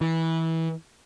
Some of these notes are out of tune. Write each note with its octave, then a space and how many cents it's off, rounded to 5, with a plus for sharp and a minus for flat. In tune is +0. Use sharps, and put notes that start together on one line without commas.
E3 -20